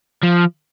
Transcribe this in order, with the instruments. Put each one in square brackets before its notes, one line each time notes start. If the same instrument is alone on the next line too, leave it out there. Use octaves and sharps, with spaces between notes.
[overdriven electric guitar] F3